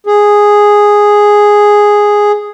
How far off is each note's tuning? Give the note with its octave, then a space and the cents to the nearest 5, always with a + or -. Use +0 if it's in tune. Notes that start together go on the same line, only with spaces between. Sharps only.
G#4 -5